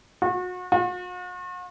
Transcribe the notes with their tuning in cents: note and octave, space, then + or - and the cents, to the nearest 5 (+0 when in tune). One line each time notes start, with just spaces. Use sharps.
F#4 -35
F#4 -45